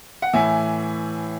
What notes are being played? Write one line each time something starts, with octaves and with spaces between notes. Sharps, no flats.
F#5
A2 E3 E5 G#5